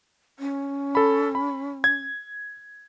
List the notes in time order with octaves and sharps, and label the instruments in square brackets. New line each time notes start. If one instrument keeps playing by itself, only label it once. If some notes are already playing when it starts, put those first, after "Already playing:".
[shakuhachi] C#4
[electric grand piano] A4 B5
B5
G#6